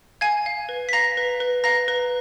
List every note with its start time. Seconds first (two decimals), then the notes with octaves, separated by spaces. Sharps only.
0.21 F5 G#5 G#6
0.46 F5
0.69 B4
0.89 B6
0.93 F5 A#5 A#6
1.17 B4
1.40 B4
1.64 F5 A#5 A#6
1.88 B4